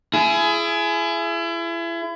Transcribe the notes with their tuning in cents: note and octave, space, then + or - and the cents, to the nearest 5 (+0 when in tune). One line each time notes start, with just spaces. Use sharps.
E4 +35 G#4 +20